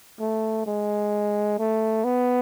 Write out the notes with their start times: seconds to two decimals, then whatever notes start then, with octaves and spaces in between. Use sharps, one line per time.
0.20 A3
0.67 G#3
1.59 A3
2.05 B3